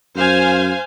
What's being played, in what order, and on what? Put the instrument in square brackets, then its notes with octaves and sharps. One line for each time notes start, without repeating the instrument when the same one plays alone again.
[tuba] F#2 [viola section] C5 F5 G#5